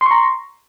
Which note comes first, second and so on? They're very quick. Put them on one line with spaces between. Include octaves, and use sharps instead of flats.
C6 C#6 A#5